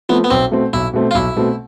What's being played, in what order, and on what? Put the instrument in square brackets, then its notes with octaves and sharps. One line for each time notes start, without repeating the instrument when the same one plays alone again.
[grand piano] F3 A3 C4 [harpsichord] B3
[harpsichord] B3
[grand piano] B1 [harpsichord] C4
[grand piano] B2 A3 C4
[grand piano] B1 [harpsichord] E4
[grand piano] B2 A3 C4
[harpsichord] F4
[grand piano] B1 [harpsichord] E4
[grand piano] B2 A3 C4